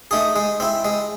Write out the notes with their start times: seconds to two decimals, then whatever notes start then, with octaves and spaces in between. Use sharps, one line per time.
0.11 A3 D#4 G#4
0.36 G#3
0.60 C4 E4
0.85 G#3